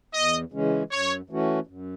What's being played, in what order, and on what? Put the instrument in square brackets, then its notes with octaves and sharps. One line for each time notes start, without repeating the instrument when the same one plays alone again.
[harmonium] E2 [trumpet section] D#5
[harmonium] C#3 E3 G#3 C#4
[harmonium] F#2 [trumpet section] C#5
[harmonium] E3 A3 C#4 F#4
F#2